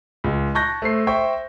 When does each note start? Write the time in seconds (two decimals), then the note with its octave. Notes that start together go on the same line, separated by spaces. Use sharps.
0.24 C#2
0.55 A5 C#6 F#6 G6 A#6
0.82 A3 C5 C7
1.07 C5 E5 G5 C#6